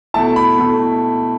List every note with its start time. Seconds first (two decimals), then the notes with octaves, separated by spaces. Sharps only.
0.14 B2 A3 E4 A5
0.36 B5
0.58 B2 A3 E4